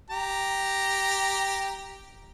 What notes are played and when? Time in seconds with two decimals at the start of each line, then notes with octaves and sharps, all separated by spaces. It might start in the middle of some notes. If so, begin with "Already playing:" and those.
0.10 G4 A#5